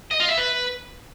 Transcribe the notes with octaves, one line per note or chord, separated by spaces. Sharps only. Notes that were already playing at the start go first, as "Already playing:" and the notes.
D#5
F4
E5
B4